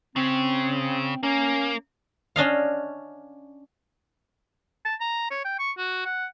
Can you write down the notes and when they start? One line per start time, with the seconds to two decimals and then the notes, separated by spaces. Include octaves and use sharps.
0.16 C#3 C4
1.23 A#3 C#4
2.36 C#4 D4 D#5 F5
4.85 A5
5.00 A#5
5.31 C#5
5.45 G5
5.59 C#6
5.78 F#4
6.06 F#5